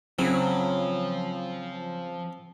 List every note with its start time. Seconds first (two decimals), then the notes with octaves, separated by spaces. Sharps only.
0.19 C#3 F3 F#3 C4